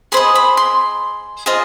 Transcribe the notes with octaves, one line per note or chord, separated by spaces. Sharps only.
G#4 C5 D#5 B5
B5
C6
F4 G#4 C5 D#5